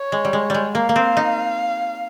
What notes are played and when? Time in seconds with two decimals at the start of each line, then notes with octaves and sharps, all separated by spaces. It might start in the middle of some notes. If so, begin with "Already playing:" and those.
Already playing: C#5
0.12 G#3
0.25 G3
0.33 G#3
0.50 G3 G#3
0.75 A#3 F5
0.89 A#3
0.96 C4
1.17 D#4